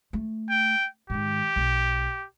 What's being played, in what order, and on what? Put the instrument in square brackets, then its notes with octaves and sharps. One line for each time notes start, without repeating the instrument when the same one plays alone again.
[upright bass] A3
[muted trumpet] G5
[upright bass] G#2 D#3 [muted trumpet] G4
[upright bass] B1